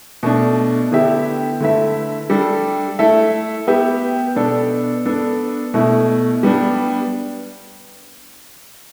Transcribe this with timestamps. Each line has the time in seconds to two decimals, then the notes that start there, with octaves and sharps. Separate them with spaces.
0.23 B2 A3 D4
0.92 D3 B3 E4 G4 E5
1.60 D3 A3 E4 B4 E5
2.30 G3 D4 A4
2.99 A3 E4 A4 E5
3.67 B3 G4 B4 E5
4.36 B2 B3 D4 A4 D5
5.06 B3 D4 A4
5.74 B2 A3 E4
6.43 G3 B3 D4